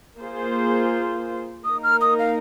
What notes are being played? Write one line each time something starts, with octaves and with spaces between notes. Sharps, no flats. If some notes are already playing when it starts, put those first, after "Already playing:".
A#3 F4 G#4 C5
A#3 D#4 A#4 D#6
F6
D#6
F5